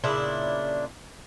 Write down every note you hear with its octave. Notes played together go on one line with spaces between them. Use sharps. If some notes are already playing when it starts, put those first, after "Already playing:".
A#2 C#3 D4 E4